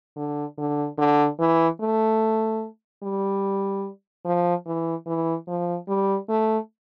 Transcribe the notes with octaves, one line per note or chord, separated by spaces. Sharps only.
D3
D3
D3
E3
A3
G3
F3
E3
E3
F3
G3
A3